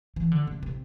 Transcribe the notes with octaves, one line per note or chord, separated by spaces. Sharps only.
E3
D3
C3
C3